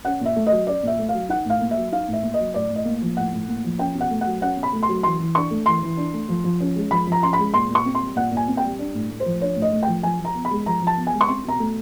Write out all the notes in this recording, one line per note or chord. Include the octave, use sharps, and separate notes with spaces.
C#4 F#5
A#2
E5
A3
F#3 D#5
C#4 D5
A#2 E5
A3
F5
F#3
D#4 F#5
A2 F5
A#3
E5
F#3
D#4 F5
A2
E5
A#3
D#5
F#3
A2 D5
A2
D#5
A#3
F3
A2 F#5
A2
A#3
F3
C#4 G5
B2
F#5
A3
F#5
F#3
C#4 F#5
B2
B5
A3
C6
F#3
E3 C6
E3
D4 C#6
A3
E3 C6
E3
D4
A3
F3
F3
C#4
G#3
F3 B5
F3
A#5
C#4 C6
B5
G#3
A#2 C6
A#2
C#6
C4
C6
G3
A#2 F#5
A#2
G#5
C4
G5
G3
D4
A2
A3
C5
F3
D4 C#5
A2
D#5
A3
F3 G5
F3 G#5
F3
A#5
B3
B5
G#3
F3 A#5
F3
A5
B3
G#5
G#3
C#6
C4 C6
B2 A#5
A3